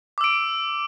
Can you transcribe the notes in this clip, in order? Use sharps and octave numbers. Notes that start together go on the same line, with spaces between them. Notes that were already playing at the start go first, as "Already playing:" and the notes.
D6 E6 D7